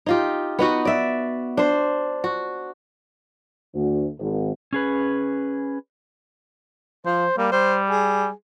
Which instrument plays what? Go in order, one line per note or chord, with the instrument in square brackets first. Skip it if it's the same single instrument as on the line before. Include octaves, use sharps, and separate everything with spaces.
[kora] D#4 F4 G4
B3 D#4 F#4
D5 E5
D4 C5
F#4
[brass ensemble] D2
G#1
[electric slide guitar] C#4 G#4 B4
[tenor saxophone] F3 [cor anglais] C5
[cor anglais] G3 [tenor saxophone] A#3
[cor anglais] G3 [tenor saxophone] C5
[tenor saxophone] G#4